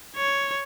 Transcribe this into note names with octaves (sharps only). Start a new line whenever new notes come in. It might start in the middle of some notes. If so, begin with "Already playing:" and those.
C#5